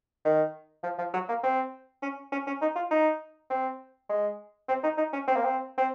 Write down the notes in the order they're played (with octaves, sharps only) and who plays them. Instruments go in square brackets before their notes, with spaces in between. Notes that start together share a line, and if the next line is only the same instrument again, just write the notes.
[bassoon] D#3
F3
F3
F#3
A#3
C4
C#4
C#4
C#4
D#4
F4
D#4
C4
G#3
C4
D#4
D#4
C#4
C4
A#3
C4
C4